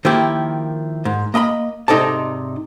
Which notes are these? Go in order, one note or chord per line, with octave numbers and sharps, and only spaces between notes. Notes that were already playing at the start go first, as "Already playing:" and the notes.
D#3 F3 A#3 E4 G4
G#2
A#3 D#5 A#5 B5
G#2 C3 D#4 A4 D5 A5